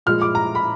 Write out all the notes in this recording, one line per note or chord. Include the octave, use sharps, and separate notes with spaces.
A#2 F3 G#3 F6
D6
A#5
B5